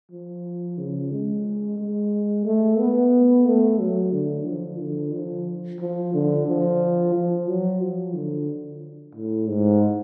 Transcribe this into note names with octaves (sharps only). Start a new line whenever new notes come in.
F3
C#3
G#3
G#3
A3
B3
A3
F#3
D3
F3
D3
F3
F3
D3
F3
F3
F#3
F3
D3
A2
G#2